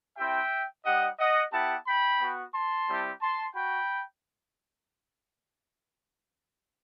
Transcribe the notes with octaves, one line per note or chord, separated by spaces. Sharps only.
C4 E4 G4 E5 G5
G3 D#4 G4 D#5 F#5
D#5 F#5
B3 E4 G4 F#5 A5
G5 B5
B3 F#4
A5 C6
G3 C4 E4 G4
A5 C6
F#4 G5 B5